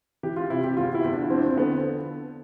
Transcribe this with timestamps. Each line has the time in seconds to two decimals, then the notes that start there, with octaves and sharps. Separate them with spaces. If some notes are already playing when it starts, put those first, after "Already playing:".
0.23 E3 G4
0.37 F4
0.50 C3 E4
0.64 G4
0.77 E2 F4
0.95 E4
1.04 E2
1.12 D4
1.30 F3 C4
1.38 D4
1.47 C4
1.57 D3 B3